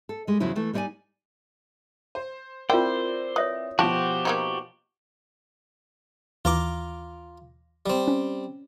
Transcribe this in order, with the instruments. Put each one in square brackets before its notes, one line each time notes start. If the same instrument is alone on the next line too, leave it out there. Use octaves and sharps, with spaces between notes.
[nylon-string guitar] A4
G3 G#3
E2 C#3 F3 F#3 E4
E3 A3
G3 D#4 E4 C#5 D5 G#5
[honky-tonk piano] C5
[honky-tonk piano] C4 E4 D5 [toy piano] F4 A#4 [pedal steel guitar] C5 [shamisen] G5
[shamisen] B4 [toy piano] C#5 E5 D#6
[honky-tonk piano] B2 F3 [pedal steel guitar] F#4 G4 C5 [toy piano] F5 [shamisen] A5
[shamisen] A#3 C4 D#4
[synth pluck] D#2 E3 [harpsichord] F4 A#5 D6
[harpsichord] G3 C4
[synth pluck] C#4